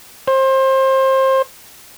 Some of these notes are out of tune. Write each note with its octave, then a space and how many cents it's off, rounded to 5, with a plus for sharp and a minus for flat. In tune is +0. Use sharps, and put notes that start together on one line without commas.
C5 +25